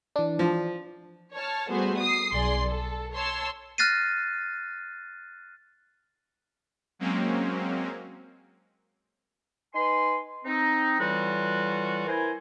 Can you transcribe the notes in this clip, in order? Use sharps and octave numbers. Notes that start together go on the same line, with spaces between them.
E3 D4
F3
C#5 A5 F6
G3 A3 B3 F#4 G#4 C5
D#6 C7
B1 G#4 D5 C6
A4
C#5 A5 C6 E6
F6 F#6 A6 A#6 C7 D#7
F#3 G#3 A#3 C4 C#4
D#4 B4 G#5 C6
C4 D#4
A2 E3 G3 F4 F#4
E3 E4 A#4 C5 G#5